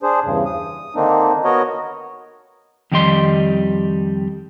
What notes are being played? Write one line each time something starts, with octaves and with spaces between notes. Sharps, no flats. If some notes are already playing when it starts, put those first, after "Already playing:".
D4 G#4 C5
E2 G2 C#3
D#6
D3 D#3 A#3 C4 D4 D#4
B3 F#4 A#4 C#5 D#5
F2 D#3 G3 G4 D#5 C6